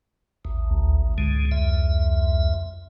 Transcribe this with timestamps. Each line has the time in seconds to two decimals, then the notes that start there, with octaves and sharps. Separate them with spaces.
0.45 A1 D#2
0.70 D2
1.18 C#2 G#2 D3 G#3
1.51 F2 E5